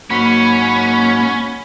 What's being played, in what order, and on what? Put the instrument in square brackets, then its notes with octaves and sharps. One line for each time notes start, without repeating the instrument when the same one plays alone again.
[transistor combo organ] G#2 F#3 F#4 [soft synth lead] A#3 [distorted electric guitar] C#4 [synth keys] B5